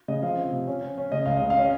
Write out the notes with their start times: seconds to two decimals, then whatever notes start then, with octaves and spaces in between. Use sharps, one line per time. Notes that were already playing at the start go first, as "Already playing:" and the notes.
0.08 C#3 D#5
0.22 F3 F5
0.38 C4
0.52 C3
0.67 C#4
0.82 C#4
0.98 C#4
1.12 C#3 D#5
1.26 C#2 F5
1.37 C#3 D#5
1.50 F5
1.58 C#4 D#5